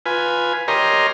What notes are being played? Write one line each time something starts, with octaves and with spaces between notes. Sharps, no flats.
F4 B4 G#5
G4 A#4 C#5 D#5 A#5 C6